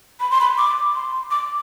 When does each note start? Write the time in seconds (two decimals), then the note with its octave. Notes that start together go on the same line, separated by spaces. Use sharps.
0.20 B5
0.31 C6
0.41 B5
0.58 D6
0.95 C6
1.31 D6